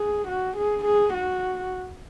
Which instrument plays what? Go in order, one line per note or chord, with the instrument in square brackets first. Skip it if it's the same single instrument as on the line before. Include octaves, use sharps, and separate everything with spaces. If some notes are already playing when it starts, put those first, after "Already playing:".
Already playing: [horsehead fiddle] G#4
F#4
G#4
G#4
F#4